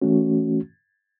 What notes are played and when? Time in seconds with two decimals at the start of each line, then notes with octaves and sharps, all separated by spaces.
0.02 E3 A3 C#4 F#4